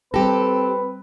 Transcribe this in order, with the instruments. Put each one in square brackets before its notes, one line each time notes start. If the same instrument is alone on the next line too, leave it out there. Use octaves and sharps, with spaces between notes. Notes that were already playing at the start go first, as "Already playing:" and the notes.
[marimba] G3 [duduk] C4 [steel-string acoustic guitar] G4 A4 [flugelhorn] B4